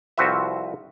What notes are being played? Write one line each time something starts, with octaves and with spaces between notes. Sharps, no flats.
C2 F3 C4 F#4 B4 E5